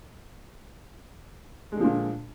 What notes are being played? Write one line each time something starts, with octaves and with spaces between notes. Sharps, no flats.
A#2 D3 F3 G#3